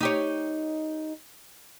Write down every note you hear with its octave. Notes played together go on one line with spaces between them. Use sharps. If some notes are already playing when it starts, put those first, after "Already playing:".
D#4 G4 C#5